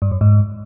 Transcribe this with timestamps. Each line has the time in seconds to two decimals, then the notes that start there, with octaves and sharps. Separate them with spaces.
0.02 G2
0.11 F#2
0.21 G#2